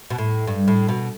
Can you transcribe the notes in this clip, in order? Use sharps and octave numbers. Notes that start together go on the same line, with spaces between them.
B2
A2
G2
A2
B2